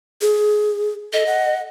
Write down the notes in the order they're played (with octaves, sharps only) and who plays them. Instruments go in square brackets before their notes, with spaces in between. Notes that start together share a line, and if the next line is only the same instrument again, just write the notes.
[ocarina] G#4
[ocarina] A4 [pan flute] D#5
[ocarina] F#5